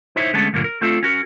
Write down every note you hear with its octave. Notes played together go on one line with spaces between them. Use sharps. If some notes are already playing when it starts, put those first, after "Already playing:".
D#4 E4 C5 C#5 E5
D3 G#3 A3 B3 C#4 A5
D2 G2 A#2 D3 F#3 A#4
A#4
A3 C4 D4 F4 A4
C#4 F#4 A#4